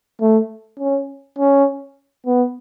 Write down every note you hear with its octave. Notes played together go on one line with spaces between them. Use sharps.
A3
C#4
C#4
B3